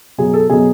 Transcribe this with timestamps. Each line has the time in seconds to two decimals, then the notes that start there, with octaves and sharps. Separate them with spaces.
0.18 B2 F#3 G#4
0.34 A4
0.50 B2 F#3 G#4